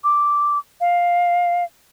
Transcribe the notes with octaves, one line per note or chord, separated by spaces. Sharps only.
D6
F5